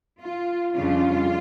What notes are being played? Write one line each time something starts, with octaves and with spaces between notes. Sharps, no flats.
F4
F2 C#3 G3 D4 F4